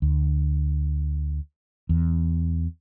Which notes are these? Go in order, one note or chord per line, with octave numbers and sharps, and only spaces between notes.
D2
E2